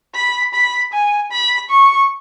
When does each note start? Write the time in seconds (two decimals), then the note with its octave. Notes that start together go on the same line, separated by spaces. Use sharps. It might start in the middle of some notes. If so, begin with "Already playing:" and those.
0.15 B5
0.54 B5
0.93 G#5
1.32 B5
1.70 C#6